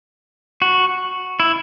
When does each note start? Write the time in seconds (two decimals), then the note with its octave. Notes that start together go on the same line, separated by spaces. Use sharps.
0.62 F#4
1.40 E4